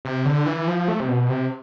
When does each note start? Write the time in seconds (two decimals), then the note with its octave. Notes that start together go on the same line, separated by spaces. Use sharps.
0.05 C3
0.26 D3
0.46 E3
0.68 F3
0.88 A3
1.00 C3
1.09 B2
1.30 C3